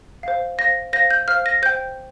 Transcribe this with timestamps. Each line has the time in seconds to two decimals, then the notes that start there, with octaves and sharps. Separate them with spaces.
0.23 C5 F5
0.58 C5 F5 A#6
0.93 C5 F5 A#6
1.10 G6
1.28 C5 F5 F6
1.46 A#6
1.62 C5 G5 G6